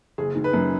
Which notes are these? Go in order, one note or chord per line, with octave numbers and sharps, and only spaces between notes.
F#1 G#4
D#3
B4
F#2